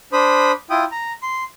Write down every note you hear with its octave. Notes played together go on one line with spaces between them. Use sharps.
D4 C5 B5 D#6
E4 F4 G5 D#6
A#5
C6